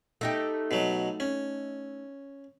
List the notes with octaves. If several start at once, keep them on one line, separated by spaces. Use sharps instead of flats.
A3 D#4 G4
B2 F#3
C#4